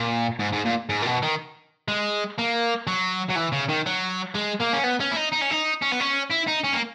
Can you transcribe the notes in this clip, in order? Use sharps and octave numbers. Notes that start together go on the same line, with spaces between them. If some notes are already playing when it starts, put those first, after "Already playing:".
Already playing: A#2
G#2
G#2
A#2
G#2
A#2
B2
D#3
G#3
A#3
F#3
F#3
E3
C#3
D#3
F#3
G#3
A#3
C#4
B3
C#4
E4
D#4
D#4
C#4
D#4
C#4
B3
C#4
E4
D#4
C#4
A#3